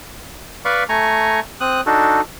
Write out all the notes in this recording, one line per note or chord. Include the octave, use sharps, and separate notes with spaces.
B4 D5 F5 B5 C#6
A3 G#5 A#5 C#6
C4 D#6 F#6
D4 D#4 F#4 A4